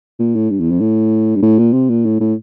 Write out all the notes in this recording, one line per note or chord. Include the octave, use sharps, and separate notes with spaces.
A#2
A2
G2
E2
F2
A2
G2
A2
A#2
C3
A#2
A2
A2